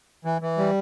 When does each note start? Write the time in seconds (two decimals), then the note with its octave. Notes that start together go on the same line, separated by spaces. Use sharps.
0.25 E3
0.42 E3
0.58 G3